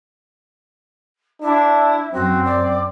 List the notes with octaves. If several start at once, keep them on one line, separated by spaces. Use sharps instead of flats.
D4 E4
F#2 C4 F#4
D5